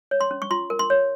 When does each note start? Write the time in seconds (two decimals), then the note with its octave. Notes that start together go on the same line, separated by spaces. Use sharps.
0.11 C#5
0.21 C6
0.31 C#4
0.42 C#6
0.51 F4 C6
0.70 A#4
0.79 C6
0.90 C#5